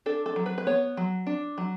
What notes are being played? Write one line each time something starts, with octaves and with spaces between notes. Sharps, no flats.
D4 A4
A4
F#3
B4
B4
B3 C#5
F#3
D4
F#3